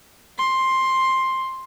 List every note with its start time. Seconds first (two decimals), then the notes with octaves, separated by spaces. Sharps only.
0.38 C6